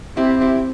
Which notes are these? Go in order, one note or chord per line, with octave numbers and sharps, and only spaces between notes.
C4 E4 G4
E4 G4